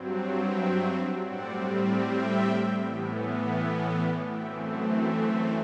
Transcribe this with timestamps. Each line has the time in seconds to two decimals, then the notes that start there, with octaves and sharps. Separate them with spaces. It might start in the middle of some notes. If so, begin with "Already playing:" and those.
Already playing: G2 F#3 C4
0.08 F#5 A5
0.46 E5 G5
1.23 A2 G3 C4 D5 F#5
2.00 E5 G5
2.78 A2 E3 B3
3.53 E5 G5
3.92 D5 F#5
4.30 F#2 E3 A3 C4 E5 G5
4.69 F#5 A5
5.07 E5 G5